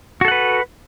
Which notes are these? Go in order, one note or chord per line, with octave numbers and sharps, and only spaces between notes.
F#4 A4 B4 F#5